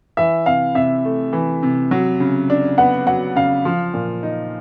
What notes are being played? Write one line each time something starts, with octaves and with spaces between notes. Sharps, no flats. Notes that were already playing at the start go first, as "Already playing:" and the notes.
E3 E5
C3 F5
C3 E5
A3
E3
C3
F#3
C#3
D4
B3 F#5
F#3 F#5
C#3 F5
F3
A#2
D#4